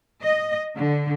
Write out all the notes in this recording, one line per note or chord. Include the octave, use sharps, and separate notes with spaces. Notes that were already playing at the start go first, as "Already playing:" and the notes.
D#5
D3